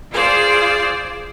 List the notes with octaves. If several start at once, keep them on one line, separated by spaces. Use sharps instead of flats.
F4 G#4 C5 D5